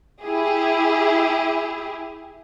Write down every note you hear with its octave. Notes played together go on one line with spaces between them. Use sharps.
E4 G4 G#4